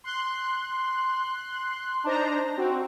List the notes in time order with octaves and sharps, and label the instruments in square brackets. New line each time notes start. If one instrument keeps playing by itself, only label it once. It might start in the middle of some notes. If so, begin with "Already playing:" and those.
[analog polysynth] C6 F#6
D4 D#4 C5 A#5
C4 F#4